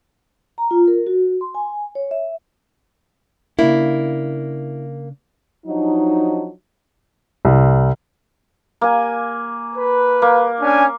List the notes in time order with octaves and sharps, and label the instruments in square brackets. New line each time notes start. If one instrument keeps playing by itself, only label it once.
[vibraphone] A#5
F4
A#4
F#4
C6
G#5
C#5
E5
[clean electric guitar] C#3 D4 [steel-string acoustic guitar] A#3 [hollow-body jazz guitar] E4
[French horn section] F3 F#3 D4 D#4
[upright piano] C2
[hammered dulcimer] A#3 G#5
[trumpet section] B4
[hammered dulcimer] A#3
[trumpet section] C#4 D4 G#5